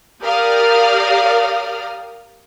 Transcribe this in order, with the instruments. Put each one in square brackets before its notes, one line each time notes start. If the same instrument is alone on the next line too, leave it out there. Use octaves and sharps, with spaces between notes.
[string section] G4 A#4 D5 F5 D#6 F6